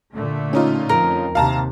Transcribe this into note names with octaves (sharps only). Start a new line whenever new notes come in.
A#2 D3 A3
C#4 D#4 F4
F2 A#4
D#2 C3 F5 A5 A#5